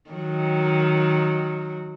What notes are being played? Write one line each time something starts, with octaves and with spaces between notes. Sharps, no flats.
D#3 F#3